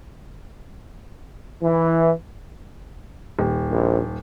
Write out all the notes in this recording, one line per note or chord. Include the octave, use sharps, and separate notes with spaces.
E3
D#1
A#1